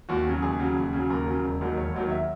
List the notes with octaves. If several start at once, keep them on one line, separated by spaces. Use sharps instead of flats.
D#2 F#4
C#3 F#3
D#2 G#4
C#3 F#3
D#2
C#3
F#3
D#2 A#4
C#3 F#3
E1
D#2 D#3 F#3
E1 C#5
D#2 D#3 F#3
E5